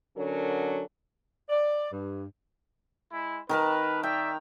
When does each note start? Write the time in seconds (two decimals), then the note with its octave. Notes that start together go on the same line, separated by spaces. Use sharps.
0.16 D3 F#3 C#4 D4 A4 A#4
1.50 D5
1.92 G2
3.13 G#3 E4
3.49 D#3 A#4 B4 A5
4.03 D5 E5 G5